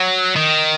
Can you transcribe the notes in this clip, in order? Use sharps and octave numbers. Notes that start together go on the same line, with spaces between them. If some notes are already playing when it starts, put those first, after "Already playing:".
Already playing: F#3
D#3